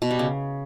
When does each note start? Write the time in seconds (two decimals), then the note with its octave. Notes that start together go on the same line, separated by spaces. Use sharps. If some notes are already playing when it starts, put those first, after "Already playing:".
0.02 B2
0.11 G3
0.19 C#3